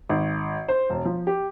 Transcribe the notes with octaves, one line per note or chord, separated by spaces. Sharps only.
G#1
C5
E1
F3
G4